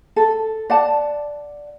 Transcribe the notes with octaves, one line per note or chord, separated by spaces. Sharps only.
A4
D5 F#5 A5